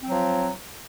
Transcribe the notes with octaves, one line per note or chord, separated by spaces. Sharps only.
F3 F#3 C4